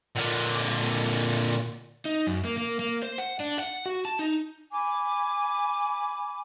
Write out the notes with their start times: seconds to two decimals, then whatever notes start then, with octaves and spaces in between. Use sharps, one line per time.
0.16 A#2 D3
2.05 D#4
2.27 F#2
2.45 A#3
2.58 A#3
2.79 A#3
3.03 C5
3.18 F#5
3.40 D4
3.59 F#5
3.86 F#4
4.05 A5
4.19 D#4
4.72 G#5 B5 D6